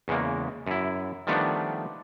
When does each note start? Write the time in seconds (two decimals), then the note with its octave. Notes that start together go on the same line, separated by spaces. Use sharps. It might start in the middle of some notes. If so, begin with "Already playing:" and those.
0.08 E2 C#3 G#3 A#3
0.67 F#2 E4
1.27 D#3 F3 G3 A3 B3 D4